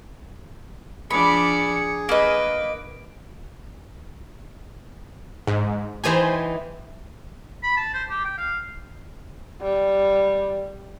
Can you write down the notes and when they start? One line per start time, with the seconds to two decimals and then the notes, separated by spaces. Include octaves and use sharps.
1.11 F3 D4 G#4 D5 B5 C#7
2.09 A#3 B4 D#5 D7
5.47 G#2
6.04 E3 D#4 G4 C5 G#5
7.63 B5
7.77 A5
7.93 C5
8.09 G4
8.24 G5
8.38 F5
9.62 G3